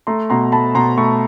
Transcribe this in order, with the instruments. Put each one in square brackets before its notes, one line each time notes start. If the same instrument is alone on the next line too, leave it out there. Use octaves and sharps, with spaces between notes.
[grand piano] A3 A#5 C6
B2 A#5 C6
A3 A5 B5
B2 A#5 C6
A3 B5 C#6